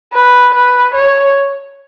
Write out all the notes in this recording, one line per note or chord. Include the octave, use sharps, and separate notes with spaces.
B4
B4
C#5